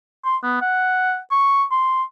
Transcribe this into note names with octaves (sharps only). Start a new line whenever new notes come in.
C6
B3
F#5
C#6
C6